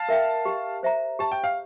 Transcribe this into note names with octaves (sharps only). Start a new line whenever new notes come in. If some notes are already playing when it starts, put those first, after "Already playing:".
Already playing: F5 A5
A#4 E5 G5
G4
C5 E5 A#5
G4 A5
G5
F5